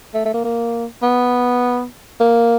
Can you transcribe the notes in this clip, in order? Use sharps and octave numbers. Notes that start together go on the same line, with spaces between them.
A3
A3
A#3
A#3
B3
A#3